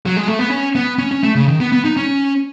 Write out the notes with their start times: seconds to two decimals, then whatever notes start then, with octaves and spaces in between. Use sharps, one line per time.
0.06 F#3
0.17 G#3
0.28 A3
0.39 B3
0.50 C#4
0.75 B3
0.98 C#4
1.11 C#4
1.23 A3
1.35 C#3
1.48 D#3
1.60 B3
1.72 B3
1.85 D#4
1.97 C#4